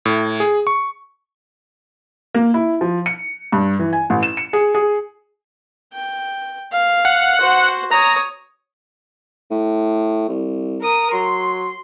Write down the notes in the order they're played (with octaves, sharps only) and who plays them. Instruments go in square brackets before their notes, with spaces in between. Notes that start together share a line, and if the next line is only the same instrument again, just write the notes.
[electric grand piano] A2
G#4
C#6
[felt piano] A#3
E4
F3
C#7
G2
E3
G#5
A1
E7
C#7
G#4
G#4
[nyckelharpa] G5
F5
[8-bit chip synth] F#5
[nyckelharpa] F#4 C5
[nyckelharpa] C#5 D#6 [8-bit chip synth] A#5
[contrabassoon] A2
C2
[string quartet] A#4 D#6
[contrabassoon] F#3 [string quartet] C6